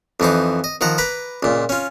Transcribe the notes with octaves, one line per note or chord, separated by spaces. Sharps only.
F2 E3 D#4 C5
D#5
D#3 F3 F#5 A#5
B4 A#5 B5 D6
C#2 A#2
C#4 F4